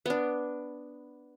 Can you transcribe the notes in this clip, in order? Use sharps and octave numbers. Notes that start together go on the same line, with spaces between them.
B3 D4